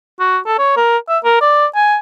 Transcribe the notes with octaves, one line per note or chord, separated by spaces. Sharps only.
F#4
A4
C#5
A#4
E5
A#4
D5
G#5